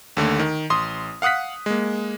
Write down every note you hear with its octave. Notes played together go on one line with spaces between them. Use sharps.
D#2 D3 A3
D#3
A1 C6 D#6
F5 F#5 D#6 F#6 B6
G#3 A#3